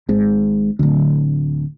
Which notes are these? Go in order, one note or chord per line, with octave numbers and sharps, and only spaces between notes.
G#1 G#2
D1 D2